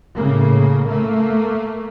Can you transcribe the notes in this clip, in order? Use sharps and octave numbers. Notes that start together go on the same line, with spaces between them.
A2 C#3 A#3
A3 A#3